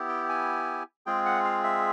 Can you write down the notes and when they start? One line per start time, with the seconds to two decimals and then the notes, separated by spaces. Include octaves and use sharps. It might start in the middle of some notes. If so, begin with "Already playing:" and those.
Already playing: B3 E4 G4
0.08 G5
0.29 G#5
1.06 G#3 C4 F4 G#4 G5
1.26 F#5
1.44 F5
1.64 E5